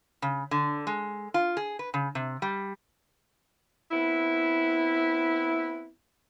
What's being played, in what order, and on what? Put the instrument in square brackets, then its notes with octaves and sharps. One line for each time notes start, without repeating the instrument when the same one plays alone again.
[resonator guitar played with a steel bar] C#3
D3
G#3
F4
G#4
B4
C#3
C3
G3
[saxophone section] B3 C4 E4